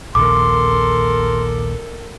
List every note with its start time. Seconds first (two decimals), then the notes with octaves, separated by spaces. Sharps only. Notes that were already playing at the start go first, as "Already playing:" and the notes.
0.15 A#1 D#2 A4 A#4 C6 D6